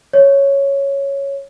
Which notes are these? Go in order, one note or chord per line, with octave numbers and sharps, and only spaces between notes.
C#5